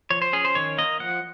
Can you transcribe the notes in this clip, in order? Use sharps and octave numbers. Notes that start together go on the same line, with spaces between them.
F3 C#5
C5
C#4 G#4
C5
D#3 C#5
A#3 D#5
F3 F#5